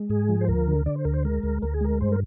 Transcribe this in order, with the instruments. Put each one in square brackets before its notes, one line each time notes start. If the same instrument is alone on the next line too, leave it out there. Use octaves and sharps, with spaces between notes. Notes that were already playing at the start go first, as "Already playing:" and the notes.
Already playing: [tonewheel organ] G#3
G#2 G#4
F3
C5
D2 A#4
D3
D3 D5
C5
D2 A#4
C5
G#3 A#4
D2
D2 A#4
G#4
G#3 A#4
G2 C5
A#4